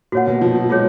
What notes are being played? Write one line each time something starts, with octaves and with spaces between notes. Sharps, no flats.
A#2 F#4 C#5 F#5
B2
F3
F#3
G#3 F4 G#4 C#5